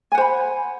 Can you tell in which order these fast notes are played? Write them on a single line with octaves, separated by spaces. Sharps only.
G#5 F#5 C5 B5